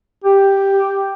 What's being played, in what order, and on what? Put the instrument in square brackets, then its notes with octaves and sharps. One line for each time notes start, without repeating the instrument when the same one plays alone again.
[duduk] G4